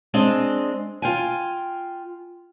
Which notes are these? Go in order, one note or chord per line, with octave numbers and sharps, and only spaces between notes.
G#3 C4 D4 D#5
F4 G5 G#5